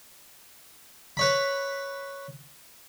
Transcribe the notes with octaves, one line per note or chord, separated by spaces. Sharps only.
B4 C#5 B5